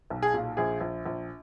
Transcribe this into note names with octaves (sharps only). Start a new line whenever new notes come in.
B1
G#4
A#2
A#1 G#4
A#1
A#1